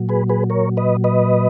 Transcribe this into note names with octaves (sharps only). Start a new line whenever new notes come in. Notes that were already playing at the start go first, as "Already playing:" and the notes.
Already playing: A#2 F#3
G#4 B4
G#4 B4
A#4 C#5
B4 D#5
B4 D#5